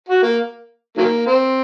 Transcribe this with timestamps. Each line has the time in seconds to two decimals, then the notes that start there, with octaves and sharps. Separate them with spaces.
0.09 F#4
0.23 A#3
0.97 D#3 F#3 A#3
1.27 C4